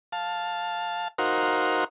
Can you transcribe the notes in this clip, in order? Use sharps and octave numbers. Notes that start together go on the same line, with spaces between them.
F5 A5
D#4 F#4 A#4 C5 F5